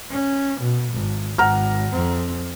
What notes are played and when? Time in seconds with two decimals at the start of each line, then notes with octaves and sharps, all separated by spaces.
0.11 C#4
0.61 B2
0.93 G#1
1.38 G#1 F#5 A#5 F6
1.93 F2 C4